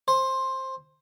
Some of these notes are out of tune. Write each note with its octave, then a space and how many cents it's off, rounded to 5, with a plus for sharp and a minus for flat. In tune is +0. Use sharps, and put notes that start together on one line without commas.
C5 +10